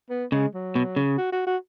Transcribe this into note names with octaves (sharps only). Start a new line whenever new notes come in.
B3
C#3 G#3
F#3
B2
C#3
F#4
F#4
F#4